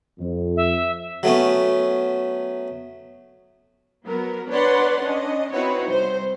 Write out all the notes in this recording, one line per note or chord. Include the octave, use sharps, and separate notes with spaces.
F2
E5
F#3 A3 B3 C#4
F#3 B3 A#4
D4 B4 C#5 D5 F#5 C6
C#4 D4 D#5
C4 D#4 E4 F#4 B4 C#5
C2 C5